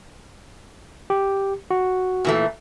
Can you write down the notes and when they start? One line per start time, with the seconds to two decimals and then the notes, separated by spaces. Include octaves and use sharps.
1.10 G4
1.71 F#4
2.25 A#2 E3 A3